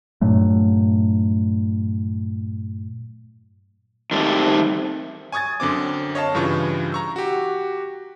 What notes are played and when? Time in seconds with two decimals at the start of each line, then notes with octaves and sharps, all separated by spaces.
0.21 G2 A#2 F#3 A3
4.11 D#3 G3 A3 C4
5.32 G#5 C#6 D#6 G#6 A6
5.60 F#2 D3 C4 D6
6.15 C#5 D#5 F5 A5
6.35 G2 C#3 E3 F4 C#6
6.92 A#5 C#6 E6
7.16 F#4 G4